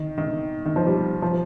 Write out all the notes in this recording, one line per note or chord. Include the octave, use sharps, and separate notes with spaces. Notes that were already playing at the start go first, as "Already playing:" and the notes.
Already playing: D#3
D#3
D#3
F3
G3
F3